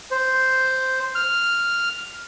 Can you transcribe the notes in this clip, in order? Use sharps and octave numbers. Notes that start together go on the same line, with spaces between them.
C5
F6